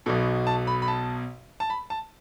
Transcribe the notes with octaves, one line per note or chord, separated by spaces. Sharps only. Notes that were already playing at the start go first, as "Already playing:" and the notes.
B1 B2 A4
A5
B5
B5
A5
A5
B5
A5